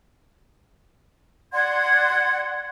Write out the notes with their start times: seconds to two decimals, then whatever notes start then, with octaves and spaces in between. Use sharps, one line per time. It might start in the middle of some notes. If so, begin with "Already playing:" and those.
1.53 D5 F#5 C6 G#6